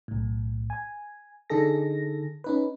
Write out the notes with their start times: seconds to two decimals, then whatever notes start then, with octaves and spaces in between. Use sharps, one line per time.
0.08 B1 A2
0.70 G#5
1.50 D3 D#4 G#4 A4 A#6
2.44 C#4 D#4 B4